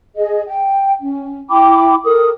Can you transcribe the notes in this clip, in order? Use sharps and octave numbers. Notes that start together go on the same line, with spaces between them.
G#4 D#5
G5
C#4
E4 G5 B5 D6
A4 A#4 D#6